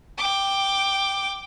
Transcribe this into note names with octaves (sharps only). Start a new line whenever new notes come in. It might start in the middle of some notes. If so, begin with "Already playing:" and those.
G5 D6